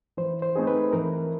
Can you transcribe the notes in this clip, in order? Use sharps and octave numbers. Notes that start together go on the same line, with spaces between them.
E3 C5
C5
A3 C4 D#4 G#4
B4
E3 A#4